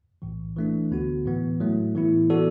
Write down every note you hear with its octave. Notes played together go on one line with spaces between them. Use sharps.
B1 A2 E3
E3 A3 D4
D2 D3 B3 F#4
A2 E3 B3
A2 F#3 A3
A2 E3 B3 E4
E3 B3 F#4 A4 D5